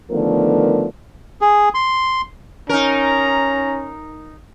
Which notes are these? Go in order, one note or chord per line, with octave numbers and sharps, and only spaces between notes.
D3 D#3 F3 A3 B3 A#4
G#4
C6
C#4 D#4 A#4 A#5